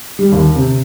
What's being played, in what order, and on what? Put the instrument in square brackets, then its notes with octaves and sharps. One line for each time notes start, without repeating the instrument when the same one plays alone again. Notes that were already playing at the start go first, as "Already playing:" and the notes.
[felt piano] G3
D#2
C3